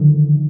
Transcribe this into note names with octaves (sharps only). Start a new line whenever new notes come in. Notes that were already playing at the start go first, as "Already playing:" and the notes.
Already playing: D3 D#3 F3